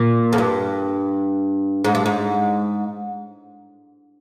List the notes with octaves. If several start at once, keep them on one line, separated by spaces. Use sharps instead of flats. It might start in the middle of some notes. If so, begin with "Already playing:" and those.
Already playing: A#2
F2
G2
G#2
G2
G#2